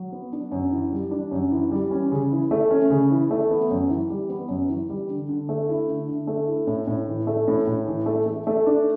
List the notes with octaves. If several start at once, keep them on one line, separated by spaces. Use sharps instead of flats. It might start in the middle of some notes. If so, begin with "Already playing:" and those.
Already playing: F#3
B3
D4
F#2
E3
G3
D4
F#2
E3
G3
C#4
C#3
E3
A3
C#4
C#3
E3
A3
B3
F#2
E3
G3
B3
F#2
E3
G3
D3
D3
A3
E4
D3
D3
A3
E4
A2
A2
E3
A3
A2
A2
E3
A3
A3
A3
D4